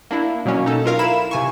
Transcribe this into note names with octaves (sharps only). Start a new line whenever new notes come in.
A#3 D4 E4
B2 F#3 A#3 C#4
D#4 A4
F4 A#4 F5
E4 B5 E7
C3 G#5 C#6